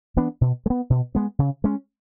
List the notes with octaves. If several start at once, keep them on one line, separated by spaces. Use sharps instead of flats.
E3 B3 D4
B2
G#3
B3
B2
G#3 B3
C#3
G#3 C#4